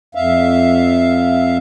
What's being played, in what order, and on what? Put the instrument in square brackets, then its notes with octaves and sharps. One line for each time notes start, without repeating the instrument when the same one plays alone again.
[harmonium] F2 E5 F5